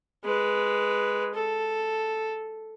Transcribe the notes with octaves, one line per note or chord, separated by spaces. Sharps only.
G#3 B4
A4